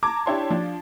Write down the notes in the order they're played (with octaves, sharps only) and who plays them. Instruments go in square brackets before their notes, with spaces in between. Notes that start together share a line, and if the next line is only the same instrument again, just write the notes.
[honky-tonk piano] A5 A#5 D6 G#6
D4 E4 G4 C#5 A5 C6
F3 D4